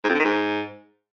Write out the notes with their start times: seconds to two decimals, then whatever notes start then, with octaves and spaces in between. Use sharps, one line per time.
0.04 G#2
0.09 F2
0.14 D3
0.19 D#3
0.24 G#2